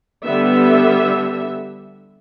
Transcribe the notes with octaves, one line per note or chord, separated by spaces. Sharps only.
D3 G3 B3 E5